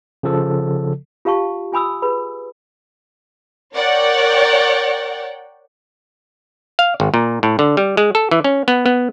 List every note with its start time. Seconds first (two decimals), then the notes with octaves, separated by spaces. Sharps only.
0.23 C#3 F3 A4
1.25 F4 G4 F5 A5 C#6
1.72 F4 G#5 B5 D#6 E6
2.02 G#4 B4 B5
3.74 A#4 C#5 D5 F#5 G5
6.79 F5
7.00 G#1
7.14 A#2
7.43 A2
7.59 D3
7.77 G3
7.97 G#3
8.15 A4
8.31 E3
8.44 C#4
8.68 B3
8.86 B3